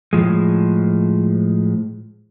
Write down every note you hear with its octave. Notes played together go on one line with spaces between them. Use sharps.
A2 F3 G#3